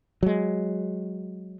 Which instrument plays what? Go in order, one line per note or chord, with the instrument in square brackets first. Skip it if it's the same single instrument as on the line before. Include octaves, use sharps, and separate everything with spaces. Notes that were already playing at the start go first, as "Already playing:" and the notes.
[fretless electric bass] F#3 G#3